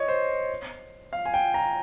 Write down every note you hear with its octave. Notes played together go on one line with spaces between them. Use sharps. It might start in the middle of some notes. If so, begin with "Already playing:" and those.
Already playing: C#5 D#5
C5
F5
G#5
G5
A#5